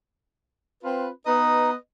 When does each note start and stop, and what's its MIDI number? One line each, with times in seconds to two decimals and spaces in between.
0.83 1.10 60
0.83 1.10 65
0.83 1.10 71
1.26 1.75 59
1.26 1.70 63
1.26 1.75 71
1.26 1.75 75